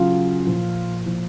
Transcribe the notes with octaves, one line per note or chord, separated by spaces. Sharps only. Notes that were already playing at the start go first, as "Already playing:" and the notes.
Already playing: C#3 F#3 F4
A#2 F3
A#2 F3